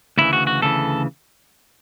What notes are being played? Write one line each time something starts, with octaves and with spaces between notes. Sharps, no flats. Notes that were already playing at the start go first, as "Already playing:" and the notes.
D2 C#3 E3 E4
F#4
F#4
D2 C#3 E3 A4